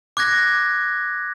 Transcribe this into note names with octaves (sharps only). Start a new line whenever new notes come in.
D6 F#6 G#6 A#6